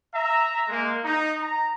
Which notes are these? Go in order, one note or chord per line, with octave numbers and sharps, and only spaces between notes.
E5 A#5
G#3 A#3
D#4
A#5